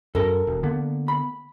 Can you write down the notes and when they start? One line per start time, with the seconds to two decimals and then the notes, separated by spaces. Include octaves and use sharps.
0.15 F#2 A4 A#4
0.47 E1
0.63 D3 A#3 B3
1.08 B5